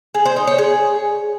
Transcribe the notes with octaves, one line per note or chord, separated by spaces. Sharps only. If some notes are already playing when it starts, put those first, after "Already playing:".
G#4
C5
D#4
C#5
G#4